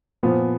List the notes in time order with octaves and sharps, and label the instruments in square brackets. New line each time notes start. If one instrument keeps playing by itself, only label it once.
[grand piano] A#2 F3 B3